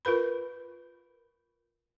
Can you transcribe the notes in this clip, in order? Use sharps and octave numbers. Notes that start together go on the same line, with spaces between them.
F4 A#4 B4 B5